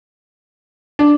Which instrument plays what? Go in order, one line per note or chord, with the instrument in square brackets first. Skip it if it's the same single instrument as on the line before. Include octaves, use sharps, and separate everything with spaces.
[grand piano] D4